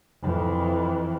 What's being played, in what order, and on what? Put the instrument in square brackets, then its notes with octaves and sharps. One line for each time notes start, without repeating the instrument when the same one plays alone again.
[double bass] F2 E3